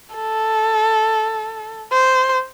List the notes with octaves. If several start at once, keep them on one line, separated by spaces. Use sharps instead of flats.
A4
C5